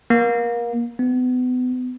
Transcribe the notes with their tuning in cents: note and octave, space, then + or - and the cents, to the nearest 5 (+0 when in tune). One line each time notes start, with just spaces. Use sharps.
A#3 +25
B3 +30